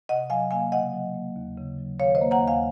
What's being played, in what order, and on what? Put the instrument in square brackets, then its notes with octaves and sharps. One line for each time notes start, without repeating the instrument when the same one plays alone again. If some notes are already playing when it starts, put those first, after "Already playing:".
[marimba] C3 D#5 F#5
F#3 F5 G#5
A#3 F5 G#5
C#3 D#5 F#5
F#3
A#3
D#2
C#3
F#3
D#3 C#5 F5
C5 D#5
A#3
F#5 A#5
D#2
F5 G#5